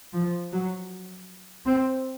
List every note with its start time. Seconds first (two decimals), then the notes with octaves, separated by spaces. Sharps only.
0.13 F3
0.52 F#3
1.66 C4